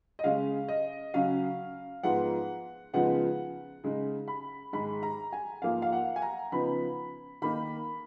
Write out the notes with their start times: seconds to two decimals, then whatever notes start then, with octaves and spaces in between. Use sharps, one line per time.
0.19 D#5
0.24 C#3 G#3 C#4 F5
0.68 D#5
1.14 C#3 F#3 C#4 F5
2.03 G#2 F3 G#3 B3 F#5
2.93 C#3 F3 G#3 B3 D#4 F#5
3.84 C#3 G#3 D#4
4.28 B5
4.73 G#2 D#3 G#3 B5
5.03 A#5
5.33 G#5
5.62 G#2 F3 A#3 F5
5.82 F5
5.92 F#5
6.16 G#5
6.22 A#5
6.52 C#3 F3 B3 D#4 B5
7.42 D#3 A#3 D#4 B5